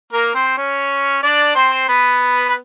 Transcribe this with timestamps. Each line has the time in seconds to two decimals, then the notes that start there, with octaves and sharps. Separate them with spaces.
0.13 A#3 A#4
0.35 C4 C5
0.57 C#4 C#5
1.23 D4 D5
1.55 C4 C5
1.89 B3 B4
2.49 B4